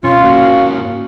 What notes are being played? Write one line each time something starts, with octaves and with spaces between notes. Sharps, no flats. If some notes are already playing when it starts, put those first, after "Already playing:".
B1 C#4 F4 F5
G#2 A#3 F#4